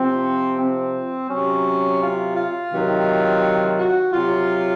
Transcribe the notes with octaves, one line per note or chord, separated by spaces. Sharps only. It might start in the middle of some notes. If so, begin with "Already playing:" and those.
Already playing: C3 F3 C4
C4
C3 F#3 C#4
F4
F4
C3 D#3 F#3
F#4
C3 F#3 F4